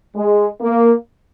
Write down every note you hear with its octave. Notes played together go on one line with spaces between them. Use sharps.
G#3
A#3